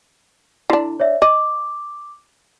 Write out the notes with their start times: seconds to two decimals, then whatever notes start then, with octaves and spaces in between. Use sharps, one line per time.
0.70 D3 D4 E4
1.00 C#5 D5 E5
1.22 D#5 D6